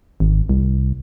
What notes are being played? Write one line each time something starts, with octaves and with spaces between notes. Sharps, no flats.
G#1
C2